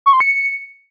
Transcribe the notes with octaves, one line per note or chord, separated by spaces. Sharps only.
C#6
C6
C#7